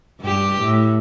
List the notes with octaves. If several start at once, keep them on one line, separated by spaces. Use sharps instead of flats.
G2 G4
A2